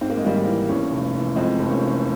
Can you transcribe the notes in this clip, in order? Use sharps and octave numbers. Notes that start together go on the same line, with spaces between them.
G#2 C4
A#3
G#3
G#1 G3 A#3
E3
E2 A#3 C#4
F1
E3
F2 G#3 C4
F1
A#3 C#4
E3